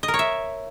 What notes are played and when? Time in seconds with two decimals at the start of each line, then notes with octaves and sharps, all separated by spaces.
0.03 D#5
0.08 A#4
0.14 C#5
0.19 E5